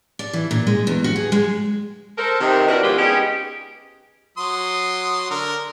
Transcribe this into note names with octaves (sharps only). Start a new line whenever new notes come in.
D5
E3
A#2
G#3
E2
F#4
G#4
G#3
A4 A#4 C5
C3 D#3
D4 E4 F#4 A#4 B4 D5
F3 G#3 B3 F4 G4 B4
B3 C#4 D#4 G4 G#4
F#3 C6 D#6
D3 A#4